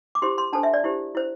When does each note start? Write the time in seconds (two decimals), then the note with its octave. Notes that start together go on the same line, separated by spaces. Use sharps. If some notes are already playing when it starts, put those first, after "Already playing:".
0.15 D6
0.22 E4 G4 C5 C6
0.38 C6
0.53 D4 A4 C5 A5
0.63 E5
0.74 D5
0.84 E4 G4 C5
1.15 E4 C5